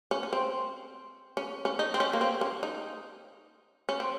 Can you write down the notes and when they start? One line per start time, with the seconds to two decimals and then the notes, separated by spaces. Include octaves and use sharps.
0.11 C#4
0.23 C#4
0.33 C4
1.37 C#4
1.65 C#4
1.79 D#4
1.94 C4
2.00 C#4
2.13 A#3
2.21 C4
2.41 C#4
2.63 D#4
3.89 C#4
4.00 C4